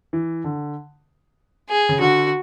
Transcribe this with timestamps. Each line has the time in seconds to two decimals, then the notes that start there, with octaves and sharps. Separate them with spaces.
0.13 E3
0.44 D3
1.70 G#4
1.89 C#3
2.00 D3 F#4